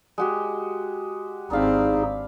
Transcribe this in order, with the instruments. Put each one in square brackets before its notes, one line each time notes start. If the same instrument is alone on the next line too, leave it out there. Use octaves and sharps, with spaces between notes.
[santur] G#3 F#4 G4
[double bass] G#1 C4 [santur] D4 F5 B5 [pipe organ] D#4 G#4